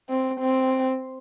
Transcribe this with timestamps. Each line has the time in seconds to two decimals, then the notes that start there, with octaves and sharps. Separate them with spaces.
0.10 C4
0.40 C4